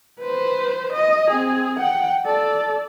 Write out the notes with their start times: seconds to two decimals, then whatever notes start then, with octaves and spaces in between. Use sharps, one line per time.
0.20 B4 C5
0.92 D#5
1.28 C4 G#4
1.79 F#5 G5
2.25 A4 D5